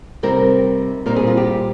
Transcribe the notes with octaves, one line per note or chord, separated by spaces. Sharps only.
C3 G3 C4 D#4 A#4
A#2 G3 C4 D#4 A#4
G#4
F4
G4